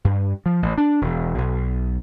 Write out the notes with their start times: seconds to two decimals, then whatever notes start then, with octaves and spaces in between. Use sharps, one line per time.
0.05 G2
0.46 F3
0.62 A1
0.78 D4
1.01 E1
1.38 B1